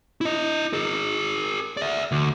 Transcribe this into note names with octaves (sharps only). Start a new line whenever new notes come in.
E4 D#5
G#4 A#4
D5 E5
D2